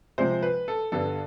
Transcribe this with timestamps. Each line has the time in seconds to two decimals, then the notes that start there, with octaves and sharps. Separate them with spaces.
0.18 C3 F3 G#3 C5
0.42 B4
0.68 A4
0.92 G2 D3 G3 B3 A4